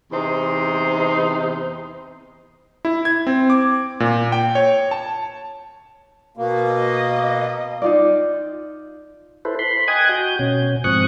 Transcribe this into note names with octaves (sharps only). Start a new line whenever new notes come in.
E2 C3 D#4 C5
E4
G#6
C4
D6
A#2
G5
C#5
A5
B2 A#3
D#5
D#4 F4 D5
E4 A4 B4 C5
B5 C6
D#5 G5 G#5 D#6 F#6 G#6
F#4 G6
B2 C#4
G#2 F3 C4 C#6 D#6 F#6